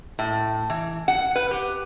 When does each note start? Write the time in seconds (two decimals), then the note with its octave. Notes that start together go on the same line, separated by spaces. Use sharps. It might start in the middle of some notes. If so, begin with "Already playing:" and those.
0.19 A2
0.70 E3
1.08 F#5
1.36 B4
1.51 G4